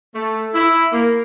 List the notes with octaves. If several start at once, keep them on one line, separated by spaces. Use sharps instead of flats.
A3
E4
A#3